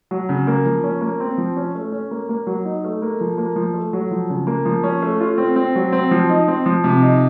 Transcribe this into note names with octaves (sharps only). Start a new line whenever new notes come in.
F#3
C#3
A#3
F3
C#4
A#3
C4
F3
C#4
A3
C#4
A#3
A#3
F#3
D#4
A3
A#3
F3
A#3
F3
A3
F#3
F3
C#3
A#3
F3
C#4
A3
F4
C4
C4
F#3
C4
F3
D#4
C4
F3
C3
D#4